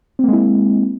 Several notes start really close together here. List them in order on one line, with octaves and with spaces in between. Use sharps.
C4 A#3 G#3 E4